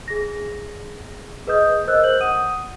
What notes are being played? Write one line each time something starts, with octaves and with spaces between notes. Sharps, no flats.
G#4 A#6
G#4 B4 D#5 D#6 G6
A#4 C5 D#5 E6 F#6
G6 F#7
F#5 D#6 D#7